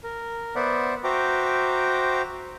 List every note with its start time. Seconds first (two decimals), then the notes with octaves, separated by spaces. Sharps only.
0.04 A#4
0.55 B3 C5 D5 E5 F#5
1.04 F#4 C5 E5 G5 A#5 D6